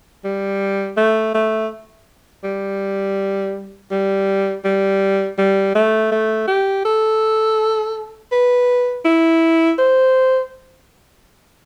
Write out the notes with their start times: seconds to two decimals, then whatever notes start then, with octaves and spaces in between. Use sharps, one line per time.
0.24 G3
0.97 A3
1.35 A3
2.44 G3
3.91 G3
4.65 G3
5.38 G3
5.75 A3
6.12 A3
6.48 G4
6.85 A4
8.32 B4
9.05 E4
9.78 C5